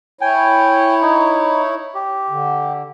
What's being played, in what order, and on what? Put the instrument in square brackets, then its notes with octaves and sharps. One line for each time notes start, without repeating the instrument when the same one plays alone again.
[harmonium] E4 C#5 [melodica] G5 G#5
[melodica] D#4
G4
[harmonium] D3